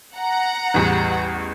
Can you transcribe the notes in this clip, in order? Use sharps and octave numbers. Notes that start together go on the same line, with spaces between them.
F#5 A#5
A1 E2 G3